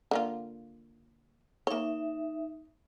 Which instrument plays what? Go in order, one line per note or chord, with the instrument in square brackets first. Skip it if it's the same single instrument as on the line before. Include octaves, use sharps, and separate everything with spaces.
[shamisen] D3 A#3 F4
[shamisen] A#3 C#5 [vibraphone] D#4 E5